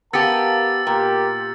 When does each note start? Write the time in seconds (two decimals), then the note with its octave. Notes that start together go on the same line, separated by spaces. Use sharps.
0.13 B3 G4 A#4 F5 A5 E6 A6 C#7
0.87 A#2 G4 A#4